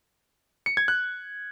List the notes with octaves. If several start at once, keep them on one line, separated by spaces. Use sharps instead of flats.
C#7
G#6
F#6